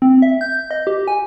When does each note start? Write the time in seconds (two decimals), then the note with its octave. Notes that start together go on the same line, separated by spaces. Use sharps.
0.02 C4
0.22 E5
0.41 G6
0.71 D#5
0.87 G4
1.08 G#5